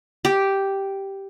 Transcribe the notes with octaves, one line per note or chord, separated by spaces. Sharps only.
G4